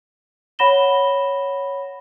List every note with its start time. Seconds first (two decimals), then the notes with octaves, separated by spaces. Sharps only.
0.59 C#5 F#5 B5 A#6 E7 G7